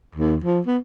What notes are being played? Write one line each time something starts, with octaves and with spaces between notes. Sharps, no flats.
D#2
F3
B3